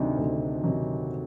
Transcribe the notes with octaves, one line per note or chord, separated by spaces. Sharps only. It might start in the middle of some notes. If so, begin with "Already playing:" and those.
Already playing: D2 C3 D#3 F#3 D4 D#4
D2
C3 D#3 F#3